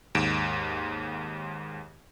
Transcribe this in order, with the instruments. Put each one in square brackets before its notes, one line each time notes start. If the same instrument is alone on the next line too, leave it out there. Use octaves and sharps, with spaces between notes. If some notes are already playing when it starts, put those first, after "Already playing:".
[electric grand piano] D#2 G#2 D7 E7